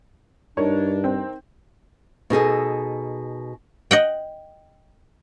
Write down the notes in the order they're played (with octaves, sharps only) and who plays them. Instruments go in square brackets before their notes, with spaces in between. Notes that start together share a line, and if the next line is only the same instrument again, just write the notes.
[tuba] G2 [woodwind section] D4 [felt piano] D#4 A#4 [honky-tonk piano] C#5
[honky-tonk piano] C4
[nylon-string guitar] B2 D#4 G#4 A4
[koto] D#5 F#5 G5